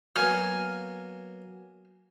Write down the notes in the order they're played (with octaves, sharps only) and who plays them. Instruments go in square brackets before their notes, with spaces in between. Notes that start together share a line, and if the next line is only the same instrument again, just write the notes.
[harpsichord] F#3 A#3 B3 [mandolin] G#5 F6